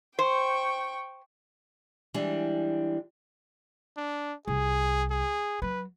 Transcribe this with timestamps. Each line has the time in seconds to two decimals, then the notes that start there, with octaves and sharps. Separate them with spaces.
0.19 C5 G5 C#6
2.14 E3 G3 G#3 D4
3.98 D4
4.48 C2 G#4
5.11 G#4
5.62 F#3 B4